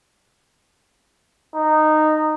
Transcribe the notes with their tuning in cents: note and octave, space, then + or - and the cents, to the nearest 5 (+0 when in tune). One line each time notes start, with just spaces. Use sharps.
D#4 -15